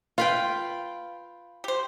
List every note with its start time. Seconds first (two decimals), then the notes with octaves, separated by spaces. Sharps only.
0.18 F4 B4 F5 G5
1.64 G4 C5